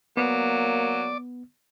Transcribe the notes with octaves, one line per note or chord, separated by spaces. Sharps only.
F#3 A#3 B3 D5 D6